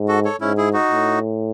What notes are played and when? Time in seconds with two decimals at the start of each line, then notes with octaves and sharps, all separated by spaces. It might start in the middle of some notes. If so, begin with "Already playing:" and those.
Already playing: G#2
0.08 F#4 A4
0.25 A4 C#5
0.41 G#2 C#4 E4
0.58 E4 G#4
0.73 D#4 F#4
0.91 A2